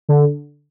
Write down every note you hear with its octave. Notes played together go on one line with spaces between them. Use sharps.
D3